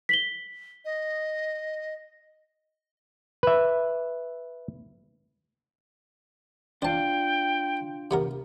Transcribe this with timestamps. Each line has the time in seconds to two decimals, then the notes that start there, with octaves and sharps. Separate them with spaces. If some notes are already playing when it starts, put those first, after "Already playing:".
0.09 B6 F#7 G7
0.85 D#5
3.43 B4 E5
6.82 D4 F4 C5 G5 A5
8.11 C3 B3 A#4